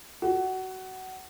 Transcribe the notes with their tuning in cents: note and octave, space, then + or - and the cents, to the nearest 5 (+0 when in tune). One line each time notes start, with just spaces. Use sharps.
F#4 +20